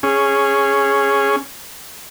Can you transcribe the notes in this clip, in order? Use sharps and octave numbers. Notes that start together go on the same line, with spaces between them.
C#4 G#4